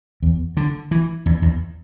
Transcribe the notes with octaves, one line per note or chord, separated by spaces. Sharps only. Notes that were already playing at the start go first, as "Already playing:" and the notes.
E2
D3
E3
E2
E2